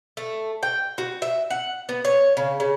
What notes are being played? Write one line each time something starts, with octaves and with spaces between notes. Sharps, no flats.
A3
G5
F#4
E5
F#5
B3
C#5
C#3
C#3